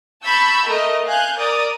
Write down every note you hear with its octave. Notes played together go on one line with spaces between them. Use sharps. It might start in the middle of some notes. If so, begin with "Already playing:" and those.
A5 B5 C#6 E6 G6
A3 A#4 D#5
F5 G#5 F#6 G6
A#4 D5 D#6